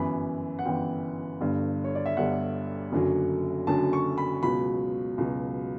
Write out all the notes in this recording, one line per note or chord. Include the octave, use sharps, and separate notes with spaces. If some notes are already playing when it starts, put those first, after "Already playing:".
Already playing: G1 F#2 E3 B5
F#5
G1 F#2 E3 G5
G1 G2 D3
C#5
D5
E5
G1 G2 D3 F#5
F#1 F#2 D3 F#3
F#1 F#2 D3 F#3 A5
C#6
B5
C#2 B2 F#3 B5
C#2 B2 F#3